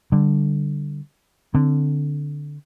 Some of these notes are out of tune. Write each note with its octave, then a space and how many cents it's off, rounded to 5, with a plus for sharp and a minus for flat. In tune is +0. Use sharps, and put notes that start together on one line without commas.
D3 +0 G3 +0
D3 +0 C4 +0